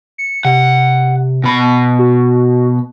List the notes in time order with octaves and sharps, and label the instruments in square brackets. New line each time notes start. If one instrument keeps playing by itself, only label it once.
[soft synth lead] C#7
[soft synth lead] C3 [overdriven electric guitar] F#5
[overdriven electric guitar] B2 B5
[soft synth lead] F#4